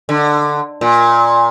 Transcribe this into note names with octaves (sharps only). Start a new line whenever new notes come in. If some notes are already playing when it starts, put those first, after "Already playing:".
D3
A#2